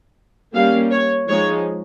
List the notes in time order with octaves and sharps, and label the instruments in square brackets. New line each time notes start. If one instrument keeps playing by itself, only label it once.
[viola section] G3 A#3 C#4 F5
C#5
F3 G#3 D#4 C#5